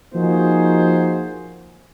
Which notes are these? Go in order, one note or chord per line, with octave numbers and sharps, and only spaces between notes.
F3 A#3 D#4 F#4 G#4 C5